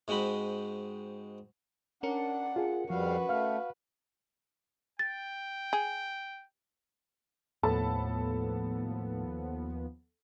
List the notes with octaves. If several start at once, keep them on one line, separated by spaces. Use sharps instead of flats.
G#2 G#3 C4 F#4 B5
C#4 D4 A#4 F#5 C#7
F4 G#4
F2 F3 G3 F#4 B4 F5
A3 F5 F6
G5 A6
G#4
D#2 A2 F3 B3 A4 A5 B5